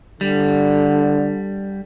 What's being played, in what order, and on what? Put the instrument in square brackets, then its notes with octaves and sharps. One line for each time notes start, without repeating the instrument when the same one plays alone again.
[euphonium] D3 [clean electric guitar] G3